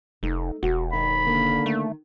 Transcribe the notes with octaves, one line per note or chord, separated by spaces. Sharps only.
F1 A3 D#4
E1 F#4
D#3 B5
D3 A#3
A3